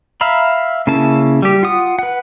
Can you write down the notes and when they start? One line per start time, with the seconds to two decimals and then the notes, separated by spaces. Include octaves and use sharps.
0.21 E5 F5 A#5 B5
0.87 C#3 A#3 C#4 E4 A5
1.42 G3 G4
1.63 F4 F#5 D#6
1.99 B4 F#5